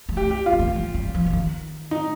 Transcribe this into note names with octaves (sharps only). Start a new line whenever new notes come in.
G3
A3 G4
G4
F4
C4
A#3
A3
G3
G3
F3
F3
D#3
D#4